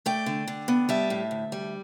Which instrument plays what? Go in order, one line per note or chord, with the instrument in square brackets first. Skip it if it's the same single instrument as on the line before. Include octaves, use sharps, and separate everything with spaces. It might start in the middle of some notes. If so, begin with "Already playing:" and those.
[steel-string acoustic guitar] A3 D5 G5
D3
D3
B3
G3 E5 A5
A2
D2
G3